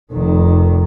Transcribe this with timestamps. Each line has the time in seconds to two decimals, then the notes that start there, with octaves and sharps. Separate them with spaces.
0.12 F1 D#3